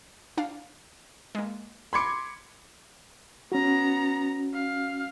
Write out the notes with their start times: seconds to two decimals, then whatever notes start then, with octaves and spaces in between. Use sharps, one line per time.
0.38 D4 F5
1.35 G#3 A#3
1.93 B5 C6 D6 G#6 C#7
3.52 B3 C#4 F#4 A#5
4.54 F5